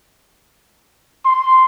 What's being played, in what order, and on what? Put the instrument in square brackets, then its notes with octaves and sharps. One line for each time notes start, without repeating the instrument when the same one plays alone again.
[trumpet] C6